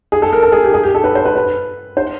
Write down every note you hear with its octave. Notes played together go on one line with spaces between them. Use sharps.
G#4
A4
A#4
A4
G#4
G4
G#4
G4
A4
B4
C5
B4
B4
C5